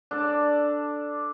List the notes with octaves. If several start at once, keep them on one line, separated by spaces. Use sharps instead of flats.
D4 A4 D5